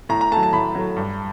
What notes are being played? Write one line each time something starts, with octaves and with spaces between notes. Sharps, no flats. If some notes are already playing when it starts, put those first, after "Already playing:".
A2 A#5
A#5
F#3 A3 A5
A5
A2 B5
F#3 A3
G2